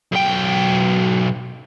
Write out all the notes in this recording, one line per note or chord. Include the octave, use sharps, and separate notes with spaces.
B1 G5